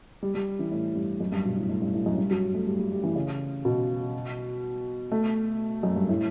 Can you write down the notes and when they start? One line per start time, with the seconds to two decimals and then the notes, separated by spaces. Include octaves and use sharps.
0.23 G3
0.35 G3
0.59 E3
0.71 A2
0.96 G2
1.20 F#2
1.32 G2
1.45 B2
1.57 A2
1.69 A2
1.82 G2
1.94 A2
2.06 F#2
2.18 G2
2.31 F#3
2.54 A3
2.67 G3
2.79 G3
2.92 G3
3.04 E3
3.16 C#3
3.65 B2
5.12 A3
5.83 F#2
5.96 G2
6.09 A2